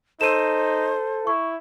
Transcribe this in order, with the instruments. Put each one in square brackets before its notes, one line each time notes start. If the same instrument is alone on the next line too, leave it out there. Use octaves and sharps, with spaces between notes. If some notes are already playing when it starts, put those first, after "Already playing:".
[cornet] D#4 [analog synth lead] A4 [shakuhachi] C5 [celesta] D#7 E7
[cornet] E4 [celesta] C#6